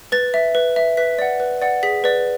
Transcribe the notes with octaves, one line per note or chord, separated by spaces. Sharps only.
B4 A6
E5
B4
E5
B4 B6
D5 F#5
B4
D5 F#5
G#4 B6
B4 D5